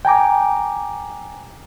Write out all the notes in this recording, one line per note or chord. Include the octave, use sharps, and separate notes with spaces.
G5 G#5 A#5 D6